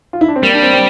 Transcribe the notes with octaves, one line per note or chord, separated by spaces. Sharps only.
F4
E4
D4
C4
G3 A#3
D4
C4
C4